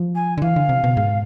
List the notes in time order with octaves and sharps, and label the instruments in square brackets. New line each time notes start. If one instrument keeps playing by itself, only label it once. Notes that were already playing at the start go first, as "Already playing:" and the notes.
Already playing: [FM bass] F3
[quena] G#5
[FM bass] D3
[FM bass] E3 [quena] F5
[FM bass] D3
C3
B2
G#2